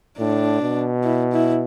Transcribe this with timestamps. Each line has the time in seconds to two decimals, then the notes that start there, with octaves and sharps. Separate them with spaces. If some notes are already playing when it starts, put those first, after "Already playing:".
0.19 A2 D4
0.62 B2
1.04 E4
1.32 E4